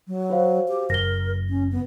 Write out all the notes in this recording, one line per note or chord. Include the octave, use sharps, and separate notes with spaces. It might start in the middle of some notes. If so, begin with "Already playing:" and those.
F#3
F#4 C5 F5
G4
F#1 A#4 A#6 G7
C#4
B3